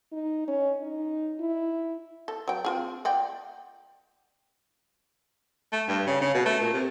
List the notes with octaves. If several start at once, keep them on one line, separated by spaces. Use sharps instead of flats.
D#4
C#4
D#4
E4
A4
F#3 G5
C4 F4 G#4
D5 F#5 G5
A3
G2
C#3
C#3
B2
A3
A#2
C3